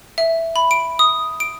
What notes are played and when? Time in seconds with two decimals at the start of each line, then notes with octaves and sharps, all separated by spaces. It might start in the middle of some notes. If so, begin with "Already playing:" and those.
0.18 E5
0.56 B5
0.71 D7
0.99 D#6
1.40 D7